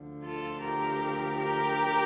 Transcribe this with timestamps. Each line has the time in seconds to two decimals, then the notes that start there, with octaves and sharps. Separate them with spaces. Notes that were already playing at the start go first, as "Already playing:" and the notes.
Already playing: D2 D3 F3
0.24 F4 A4
0.62 G4 A#4
1.39 G4 A#4